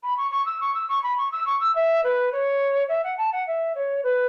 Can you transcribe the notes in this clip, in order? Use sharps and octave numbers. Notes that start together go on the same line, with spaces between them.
B5
C#6
C#6
E6
C#6
E6
C#6
B5
C#6
E6
C#6
E6
E5
B4
C#5
E5
F#5
A5
F#5
E5
C#5
B4